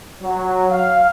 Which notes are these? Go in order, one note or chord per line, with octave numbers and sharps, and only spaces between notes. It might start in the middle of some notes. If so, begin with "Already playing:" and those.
F#3
F5